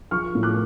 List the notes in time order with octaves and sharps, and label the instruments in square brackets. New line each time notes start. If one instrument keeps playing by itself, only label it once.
[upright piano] F3 C#6 F6
A2
D6 F#6